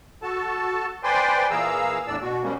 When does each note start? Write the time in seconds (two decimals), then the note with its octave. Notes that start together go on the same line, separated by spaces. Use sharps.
0.22 F#4 A4 A5
1.04 B4 C5 D5 G5 G#5 C6
1.51 A#2 E3 G#4 F5 A#5 E6
2.07 E2 A2 D4 D5 E6
2.22 B2 F#4
2.43 B2 F3 G3 G#3 A#3 C#4